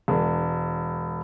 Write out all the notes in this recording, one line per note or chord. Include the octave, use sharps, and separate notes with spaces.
E1